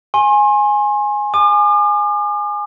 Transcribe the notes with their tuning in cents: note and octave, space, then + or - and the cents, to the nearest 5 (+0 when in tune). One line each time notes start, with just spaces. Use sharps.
G#5 +0 C6 +40
G#5 +0 D6 +45